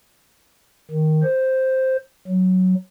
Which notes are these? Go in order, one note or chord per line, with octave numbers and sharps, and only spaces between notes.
D#3
C5
F#3